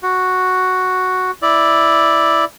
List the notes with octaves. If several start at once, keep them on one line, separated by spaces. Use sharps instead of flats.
F#4
E4 D5